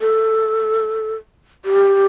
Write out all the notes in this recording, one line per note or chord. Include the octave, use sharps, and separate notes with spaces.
A4
G4